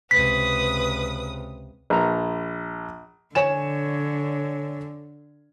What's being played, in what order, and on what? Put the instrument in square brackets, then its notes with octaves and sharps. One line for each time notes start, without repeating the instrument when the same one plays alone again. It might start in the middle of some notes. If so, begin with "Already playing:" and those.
[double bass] C#2 C3 [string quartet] B4 D#6 [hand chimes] B6
[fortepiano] A#1 A#5
[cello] D3 [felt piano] C#5 G#5 E7